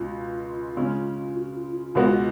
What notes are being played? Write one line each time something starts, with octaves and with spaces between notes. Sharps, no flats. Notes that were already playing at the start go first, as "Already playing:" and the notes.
Already playing: C#2 B2 G#3 F4
C#3 G#3 C#4
F#4
F4
F4
C#2 B2 G#3 B3 F4 F#4
F4